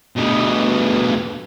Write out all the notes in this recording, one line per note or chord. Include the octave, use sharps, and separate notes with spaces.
D2 B2